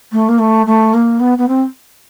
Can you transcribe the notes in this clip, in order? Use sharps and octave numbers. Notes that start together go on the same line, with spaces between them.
A3
A#3
A3
A3
A#3
B3
B3
C4